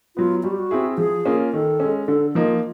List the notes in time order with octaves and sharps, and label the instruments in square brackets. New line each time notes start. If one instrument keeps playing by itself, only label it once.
[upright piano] F#3 B3 [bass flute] F4
[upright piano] G3 [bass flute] F#4
[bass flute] G4
F#4
[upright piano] C4 E4 G#4
[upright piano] F3 [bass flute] G#4
[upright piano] A#3 C#4 F4
[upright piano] D#3 [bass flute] A4
[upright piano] G#3 C#4
[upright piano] D3 [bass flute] A4
[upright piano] F3 A#3 D#4 [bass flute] F4